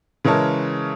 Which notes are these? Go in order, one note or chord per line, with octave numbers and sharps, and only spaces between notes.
C#3 E3 G#3 A#4 C#5 A5